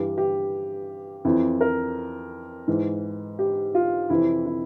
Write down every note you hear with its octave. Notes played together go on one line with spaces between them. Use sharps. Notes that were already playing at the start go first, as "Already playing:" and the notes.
Already playing: G2 E3 G4
G4
F2 E3 E4
A#4
G#2 E3
G4
F4
F2 C3 E3 E4
E4